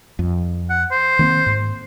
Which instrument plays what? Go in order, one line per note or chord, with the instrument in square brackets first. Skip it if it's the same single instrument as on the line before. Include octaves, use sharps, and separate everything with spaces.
[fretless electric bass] F2
[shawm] F#5
C5
[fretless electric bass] D#3 A#3 C4
G#2